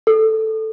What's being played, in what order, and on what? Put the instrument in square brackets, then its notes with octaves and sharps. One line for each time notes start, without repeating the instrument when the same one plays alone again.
[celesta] A4